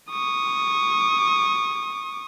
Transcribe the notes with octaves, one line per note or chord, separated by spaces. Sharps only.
C#6 D#6